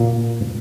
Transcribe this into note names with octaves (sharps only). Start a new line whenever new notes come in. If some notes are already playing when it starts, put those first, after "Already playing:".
Already playing: A#2 A#3